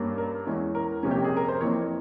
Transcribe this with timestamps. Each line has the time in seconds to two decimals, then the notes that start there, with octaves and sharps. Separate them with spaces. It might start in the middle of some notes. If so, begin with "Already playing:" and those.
Already playing: G2 G3 A#3 C#4
0.18 A#4
0.47 E2 E3 G#3 C#4
0.75 A#4
1.03 F2 C3 G3 A#3 C#4
1.11 G4
1.24 G#4
1.37 A#4
1.48 C5
1.61 F2 E3 A#3 C#5